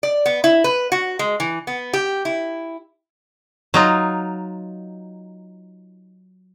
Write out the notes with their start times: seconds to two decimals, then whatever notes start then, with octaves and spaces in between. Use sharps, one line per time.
0.03 D5
0.26 B3
0.44 E4
0.64 B4
0.92 F#4
1.19 G#3
1.40 E3
1.67 B3
1.93 G4
2.25 E4
3.74 F#3 D#4 F4